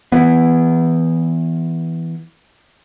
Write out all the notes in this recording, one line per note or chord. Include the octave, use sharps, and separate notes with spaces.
E3 B3